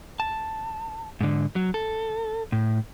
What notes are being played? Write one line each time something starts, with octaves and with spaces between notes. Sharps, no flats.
A5
G#2 D3
F#3
A4
A2